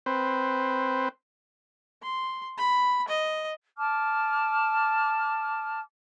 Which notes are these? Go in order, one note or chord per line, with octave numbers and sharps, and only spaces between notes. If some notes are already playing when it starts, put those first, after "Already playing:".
C4 B4 C5
C6
B5
D#5
A5 D6 F6